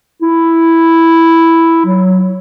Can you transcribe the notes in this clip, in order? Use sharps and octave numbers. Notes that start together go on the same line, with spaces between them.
E4
F#3